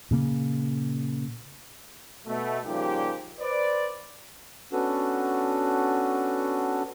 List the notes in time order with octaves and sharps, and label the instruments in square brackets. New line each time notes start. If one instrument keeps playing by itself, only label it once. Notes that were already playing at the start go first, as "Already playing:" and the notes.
[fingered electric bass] A#2 C#3 A#3
[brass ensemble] B2 A3
A#2 C#3 F3 G3 D#4 G4
B4 C5 D5
[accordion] B3 C#4 D4 F#4 A4 B4